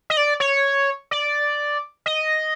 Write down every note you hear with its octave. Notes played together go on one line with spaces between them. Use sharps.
D#5
D5
C#5
D5
D#5